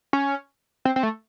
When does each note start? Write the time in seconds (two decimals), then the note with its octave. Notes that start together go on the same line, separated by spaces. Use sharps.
0.13 C#4
0.85 C4
0.96 C4
1.03 A3